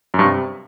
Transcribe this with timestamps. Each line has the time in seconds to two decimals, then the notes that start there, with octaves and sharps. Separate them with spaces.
0.14 F#2
0.19 G2
0.24 C3